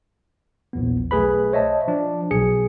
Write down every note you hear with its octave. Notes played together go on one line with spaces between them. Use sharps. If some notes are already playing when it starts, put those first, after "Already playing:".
A#1 E2 B3
B1 A3 G#4 B4 B5
C5 C#5 D#5 E5 A5
F3 D4
B1 G#4 C#7